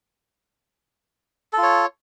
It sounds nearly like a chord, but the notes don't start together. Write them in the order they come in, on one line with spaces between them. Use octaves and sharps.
A4 F4 C#5